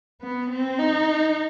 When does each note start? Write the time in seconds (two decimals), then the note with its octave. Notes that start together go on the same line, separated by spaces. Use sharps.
0.22 B3
0.50 C4
0.79 D#4